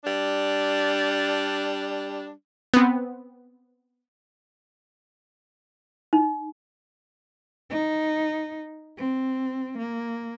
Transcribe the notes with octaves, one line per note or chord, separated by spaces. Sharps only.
G3 D4
B3 C4
D#4
D#4
C4
A#3